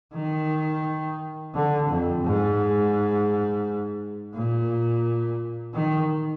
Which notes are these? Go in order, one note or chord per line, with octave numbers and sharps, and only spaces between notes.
D#3
D3
F2
G#2
A#2
D#3